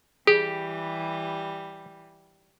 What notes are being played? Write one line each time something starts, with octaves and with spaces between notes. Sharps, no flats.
E3 G3 G4 G#4